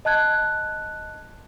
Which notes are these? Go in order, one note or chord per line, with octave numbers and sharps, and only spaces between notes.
D#5 A5 F#6 G#6